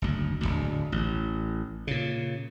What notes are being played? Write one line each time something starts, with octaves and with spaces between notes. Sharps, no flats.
F#1 D2
D1 G1 D2
A1
A#2 C#3